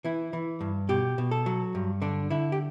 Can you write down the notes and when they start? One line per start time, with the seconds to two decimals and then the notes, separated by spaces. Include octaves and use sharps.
0.04 E3 E4
0.33 E3
0.60 G2
0.89 B2 G4
1.18 B2
1.31 A4
1.46 F#3
1.75 G2
2.02 D3 D4
2.30 D3 E4
2.52 G4